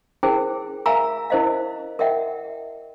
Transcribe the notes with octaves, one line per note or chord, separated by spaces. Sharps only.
E4 G#4 A#4 C5 G5
A#4 E5 F5 G#5 A#5 E6
E4 A#4 C5 D#5 F5
A#4 D#5 E5 F#5 G5